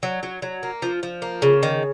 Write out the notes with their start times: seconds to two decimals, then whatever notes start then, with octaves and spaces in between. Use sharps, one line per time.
0.03 F#3
0.23 F#3
0.42 F#3
0.63 A#3
0.82 F3
1.03 F3
1.22 A#3
1.42 C#3
1.63 D#3